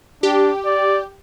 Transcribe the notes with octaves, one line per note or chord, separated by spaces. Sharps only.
D4 G4
D5